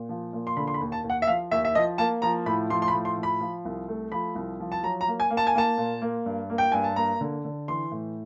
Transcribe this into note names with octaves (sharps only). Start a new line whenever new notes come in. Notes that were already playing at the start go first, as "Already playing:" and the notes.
Already playing: A#2
F3
A#2
C6
D3 B5
C6
B5
D#2
A5
D#2
F#5
E5
F3 F5
D#2 E5
E5
F3 D#5
A#3 A5
F3 A#5
A2 B5
F3 C6
C6
B5
A2
C6
F3
B5
F3
C2
A3
F3 B5
C2
F3
A5
F#3 A#5
A#5
A#3
G#5
A#3
A5
G#5
A#3 A5
A#2
A#3
G2
A#3
G5
G2 G#5
A5
A#3 A#5
D3
D3
E3 C6
A2